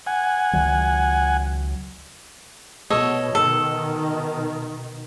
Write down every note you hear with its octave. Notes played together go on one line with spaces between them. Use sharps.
F#5 G#5
C#2 D#3 F#3
B2 A4 C#5 D#5
B2 D#3 A4